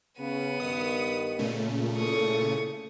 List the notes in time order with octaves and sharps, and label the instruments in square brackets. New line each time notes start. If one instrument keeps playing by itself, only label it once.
[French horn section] C#3 [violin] B3 D#7
[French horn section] G2 D#3 [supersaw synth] D#6
[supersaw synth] A#2 C#3 A3
[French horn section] D4 E4 A4 [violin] C#6 D#6